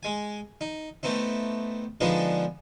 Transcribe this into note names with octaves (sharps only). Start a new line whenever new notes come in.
G#3 G#5
D#4
A3 B3 C4 D#4
D3 F3 G#3 B3 D4 D#4